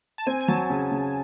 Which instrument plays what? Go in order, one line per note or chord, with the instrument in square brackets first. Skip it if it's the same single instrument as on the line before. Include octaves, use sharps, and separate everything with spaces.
[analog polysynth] A5
[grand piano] C4 [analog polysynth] G#5
[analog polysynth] G#5
[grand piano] F#3 [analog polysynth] A5
[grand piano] C#3
C#3